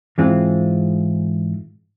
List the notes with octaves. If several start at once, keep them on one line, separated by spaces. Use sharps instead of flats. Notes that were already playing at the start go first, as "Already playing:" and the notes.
G#2 E3 G#3 C4 F4